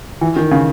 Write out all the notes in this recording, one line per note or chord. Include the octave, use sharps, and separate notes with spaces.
E3
D#3
C#3